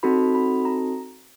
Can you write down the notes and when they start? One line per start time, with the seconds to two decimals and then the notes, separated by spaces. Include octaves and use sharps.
0.03 C4 D#4 F#4 A4 B5
0.35 B5
0.65 A#5